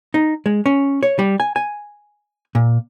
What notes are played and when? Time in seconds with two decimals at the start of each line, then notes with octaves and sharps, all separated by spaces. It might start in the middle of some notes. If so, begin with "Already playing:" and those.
0.14 D#4
0.46 G#3
0.66 C#4
1.03 C#5
1.19 G3
1.40 G#5
1.56 G#5
2.55 A#2